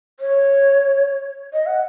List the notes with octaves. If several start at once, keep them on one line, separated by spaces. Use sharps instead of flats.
C#5
D#5
F#5